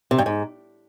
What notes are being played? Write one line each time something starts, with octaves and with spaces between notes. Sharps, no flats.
C3
G2
G#2